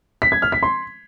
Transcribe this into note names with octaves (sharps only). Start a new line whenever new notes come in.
B6
G#6
F6
B6
C6